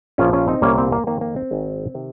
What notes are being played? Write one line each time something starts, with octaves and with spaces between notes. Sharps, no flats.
A#1 A#2 F3 C#4 F4
C#4 F4
C4 D#4
C2 A#2 G3 A#3 C#4
C4
A#3
F2 D#3 A#3
A#3
C4
G#1 G#2 D#3 G#3
C3 D#3